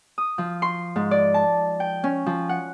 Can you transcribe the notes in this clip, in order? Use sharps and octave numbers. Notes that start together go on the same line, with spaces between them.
D#6
F3
C6
G#2
D5
A5
G5
C#4
F3
F#5